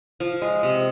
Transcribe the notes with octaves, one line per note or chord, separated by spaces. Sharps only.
F3
G#3
C3